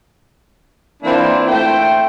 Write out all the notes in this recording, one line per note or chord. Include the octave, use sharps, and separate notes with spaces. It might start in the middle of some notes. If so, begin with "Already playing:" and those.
E3 A#3 C4 D4 E4 F4
A3 E4 C5 G5